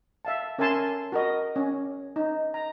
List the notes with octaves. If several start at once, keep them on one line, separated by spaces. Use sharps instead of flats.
E5 F5 A5
C#4 A#4 E5 G#5 A5 C6
F#4 A#4 D#5
C#4
D#4
A#5